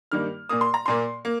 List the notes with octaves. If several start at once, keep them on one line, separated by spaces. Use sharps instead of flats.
G2 D#3 G3 A#3 F6
A#2 A#3 D#6
C6
A#5
A#2 A#3 C6
A#3